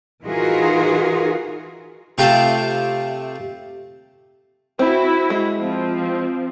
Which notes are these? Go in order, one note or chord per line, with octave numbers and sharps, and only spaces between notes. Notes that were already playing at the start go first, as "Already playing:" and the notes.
E3 D#4 F4 F#4 G#4 A#4
C3 A3 F4 G5 A5
C4 E4 F#4
G#3
F3 C4